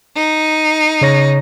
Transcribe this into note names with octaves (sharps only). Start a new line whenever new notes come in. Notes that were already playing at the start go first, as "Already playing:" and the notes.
D#4
C#3 C#5 A#6